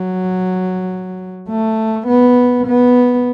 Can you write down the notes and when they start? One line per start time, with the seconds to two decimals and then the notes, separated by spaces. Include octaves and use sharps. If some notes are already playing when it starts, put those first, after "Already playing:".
Already playing: F#3
1.49 A3
2.07 B3
2.67 B3